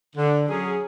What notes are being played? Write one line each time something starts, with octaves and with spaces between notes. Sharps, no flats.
D3
F#3 C#4 G#4